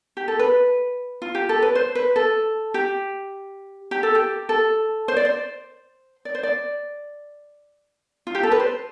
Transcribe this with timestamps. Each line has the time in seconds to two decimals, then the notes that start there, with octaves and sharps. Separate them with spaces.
0.17 G4
0.28 A4
0.39 B4
1.22 F4
1.35 G4
1.49 A4
1.62 B4
1.75 C5
1.95 B4
2.16 A4
2.74 G4
3.91 G4
4.03 A4
4.15 G4
4.49 A4
5.08 C5
5.17 D5
5.25 C5
6.25 D5
6.35 C5
6.43 D5
8.27 F4
8.35 G4
8.43 A4
8.52 B4
8.60 C5